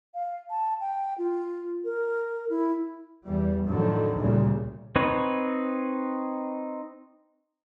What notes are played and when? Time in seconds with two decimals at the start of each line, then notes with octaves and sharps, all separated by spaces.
0.14 F5
0.50 A5
0.80 G5
1.18 F4
1.85 A#4
2.50 E4
3.26 E2 E3 G3
3.66 F2 A2 D3 D#3 F3 F#3
4.18 D2 A#2 C#3 G3
4.96 C4 D#4 B4 C#5